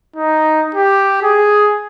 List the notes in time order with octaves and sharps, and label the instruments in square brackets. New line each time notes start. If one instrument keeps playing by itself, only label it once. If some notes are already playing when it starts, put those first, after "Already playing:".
[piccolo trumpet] D#4
G4
G#4